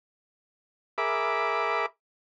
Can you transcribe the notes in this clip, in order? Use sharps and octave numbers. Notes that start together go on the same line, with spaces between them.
G#4 A#4 E5 B5 D6